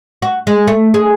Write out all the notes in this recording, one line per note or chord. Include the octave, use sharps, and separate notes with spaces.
F#4
G#3
A3
G#4